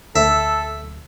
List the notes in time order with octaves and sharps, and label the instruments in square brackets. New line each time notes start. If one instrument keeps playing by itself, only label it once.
[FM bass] D2 [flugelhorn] A4 [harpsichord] E5